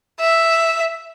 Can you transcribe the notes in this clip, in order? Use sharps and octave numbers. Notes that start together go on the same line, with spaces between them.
E5